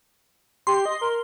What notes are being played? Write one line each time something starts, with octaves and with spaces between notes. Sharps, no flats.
G4 C6
D#5
A#4